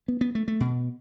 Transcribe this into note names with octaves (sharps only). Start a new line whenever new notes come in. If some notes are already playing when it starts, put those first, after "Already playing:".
B3
B3
A3
A3
B2